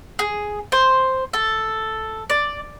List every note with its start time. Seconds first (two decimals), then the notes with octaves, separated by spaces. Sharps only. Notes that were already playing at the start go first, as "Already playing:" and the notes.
0.19 G#4
0.72 C5
1.33 A4
2.30 D5